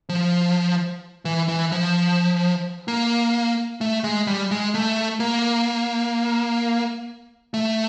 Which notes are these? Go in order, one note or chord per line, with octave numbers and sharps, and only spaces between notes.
F3
E3
E3
F3
A#3
A3
G#3
G3
G#3
A3
A#3
A3